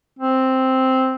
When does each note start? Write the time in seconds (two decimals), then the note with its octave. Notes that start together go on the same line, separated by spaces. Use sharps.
0.19 C4